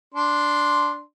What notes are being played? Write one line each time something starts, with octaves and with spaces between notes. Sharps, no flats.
D4 C6